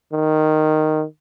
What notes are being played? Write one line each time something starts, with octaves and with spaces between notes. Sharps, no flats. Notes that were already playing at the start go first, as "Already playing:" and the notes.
D#3